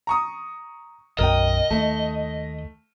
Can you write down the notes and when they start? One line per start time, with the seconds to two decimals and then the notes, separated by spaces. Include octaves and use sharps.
0.07 A#5 C#6 D#6
1.19 B1 F#2 B2 A#4 D#5 G5
1.70 D#2 A3